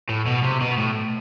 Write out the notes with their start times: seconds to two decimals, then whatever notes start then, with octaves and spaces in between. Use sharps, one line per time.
0.09 A2
0.26 B2
0.43 C3
0.61 B2
0.78 A2